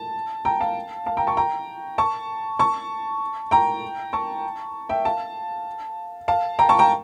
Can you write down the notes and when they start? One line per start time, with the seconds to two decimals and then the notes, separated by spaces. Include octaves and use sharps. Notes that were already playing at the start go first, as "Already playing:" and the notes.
Already playing: A5
0.45 G5 A#5
0.60 F5 A5
1.06 F5 A5
1.17 G5 A#5
1.27 A5 C#6
1.37 G5 A#5
1.98 A5 C#6
2.59 A5 C#6
3.51 G5 A#5
4.13 A5 C#6
4.89 E5 G5
5.05 F5 A5
6.28 F5 A5
6.59 G5 A#5
6.69 A5 C#6
6.79 G5 A#5